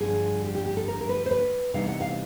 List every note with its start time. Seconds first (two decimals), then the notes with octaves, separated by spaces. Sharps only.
0.01 G2 D3 F3 G#4
0.44 G4
0.55 G4
0.66 G4
0.77 A4
0.88 A#4
1.01 A#4
1.09 B4
1.26 C5
1.31 B4
1.74 C3 E3 G3 B3 D#4 F5
1.88 F#5
2.01 F5